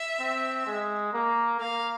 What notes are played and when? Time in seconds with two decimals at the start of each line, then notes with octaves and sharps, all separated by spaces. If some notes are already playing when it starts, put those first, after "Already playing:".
Already playing: E5
0.20 C4
0.66 G#3
1.13 A#3
1.60 A#3 F5